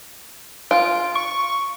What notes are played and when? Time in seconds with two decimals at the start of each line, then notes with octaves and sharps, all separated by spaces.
0.71 F4 D7
1.15 C#6